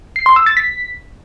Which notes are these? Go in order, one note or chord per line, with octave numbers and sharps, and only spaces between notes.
C7
C6
E6
A6
B6